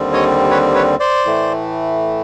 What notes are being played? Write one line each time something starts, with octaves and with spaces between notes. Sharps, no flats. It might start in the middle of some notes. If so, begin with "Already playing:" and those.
Already playing: D#2 D3 G3 C4
C#5 D#5
B4 C#5
B4 C#5
C5 D5
A2 E3 A3